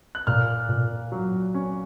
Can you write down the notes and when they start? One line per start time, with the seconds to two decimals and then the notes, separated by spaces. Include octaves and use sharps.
0.15 F#6
0.27 A#2 F6
0.69 A#2
1.12 F#3
1.54 C#4